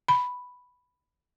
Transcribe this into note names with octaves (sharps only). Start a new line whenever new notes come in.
B5